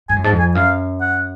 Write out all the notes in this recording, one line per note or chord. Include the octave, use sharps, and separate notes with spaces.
G#2 G#5
F#2
G#2 A5
F2
G#5
F#2 F5
F#5